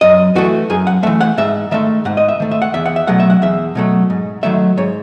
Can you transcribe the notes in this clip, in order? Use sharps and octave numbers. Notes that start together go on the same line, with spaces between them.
F#2 D#5
E3 A3 F#4
F#2 G#4
F#5
E3 A3 E5
F#5
G#2 E5
D#3 A3 E5
G#2 F#5
D#5
E5
D#3 A3
E5
F#5
E2 E5
F#5
E5
B2 F#3 A3 F#5
E5
F#5
E2 E5
B2 F#3 A3
G#2
D#3 F#3 A3 E5
G#2 C#5